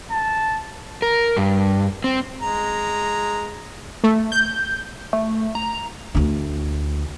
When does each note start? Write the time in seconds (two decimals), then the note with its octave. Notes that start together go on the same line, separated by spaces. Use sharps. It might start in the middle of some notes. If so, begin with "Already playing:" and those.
0.11 A5
1.02 A#4
1.37 G2
2.04 C4
2.41 G#3 A#5
4.04 A3
4.32 G6
5.13 A3
5.55 A#5
6.15 D2 D4